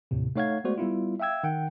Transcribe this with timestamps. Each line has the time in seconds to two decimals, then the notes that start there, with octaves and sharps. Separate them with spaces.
0.11 D#2 A2 C3
0.36 A3 D#4 C#5 F5 F#5 G#6
0.64 G#3 A3 B3 F#4 C5 D5
0.78 G3 B3 E4 F4
1.20 E5 F5 G5 E6 G#6
1.44 D#3 F#5 G5